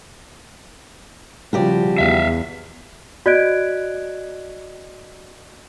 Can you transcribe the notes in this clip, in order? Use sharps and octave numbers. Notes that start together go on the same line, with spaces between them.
C#3 F3 G3 F#4 G4 D5
E2 E5 F5
F#4 D5 D#5 F#6 G#6 D7